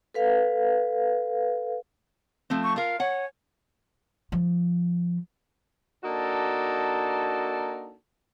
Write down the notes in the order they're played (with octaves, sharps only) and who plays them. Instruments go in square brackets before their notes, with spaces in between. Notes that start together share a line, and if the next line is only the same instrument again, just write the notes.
[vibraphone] A4 B4 F5
[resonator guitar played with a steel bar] F3 A3 C4
[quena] C#6
[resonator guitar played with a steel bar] F4 A#4 [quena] F5
[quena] C#5 [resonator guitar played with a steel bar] F#5 G#5
[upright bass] F3
[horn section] A#3 D4 D#4 F#4 A4